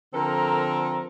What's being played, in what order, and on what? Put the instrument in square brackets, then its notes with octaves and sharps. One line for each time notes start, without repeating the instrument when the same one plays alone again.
[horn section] D3 F3 C4 A4 A#4